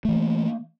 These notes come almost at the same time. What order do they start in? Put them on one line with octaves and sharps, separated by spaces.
A3 E3 C#4 A#3